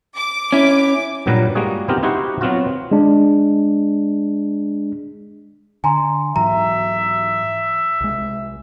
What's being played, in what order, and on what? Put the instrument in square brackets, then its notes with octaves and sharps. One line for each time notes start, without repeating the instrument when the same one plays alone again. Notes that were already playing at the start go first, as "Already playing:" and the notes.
[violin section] D6
[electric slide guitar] C#4 E4
[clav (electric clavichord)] G2 A#2 F#3 G3 B4 A#5
G3 G#3 A#3 F#4 G#4
B3 C4 D#4 F4 G4 A#4
D#4 E4 F#4 G4 C5 F#5
F#3 B3 C4 F4 F#4
[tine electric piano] G#3 D4
[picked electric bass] D3 [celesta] G#5 A#5 C6
[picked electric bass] G#2 E3 F#3 [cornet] E5 [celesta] A#5
[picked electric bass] C2 G#3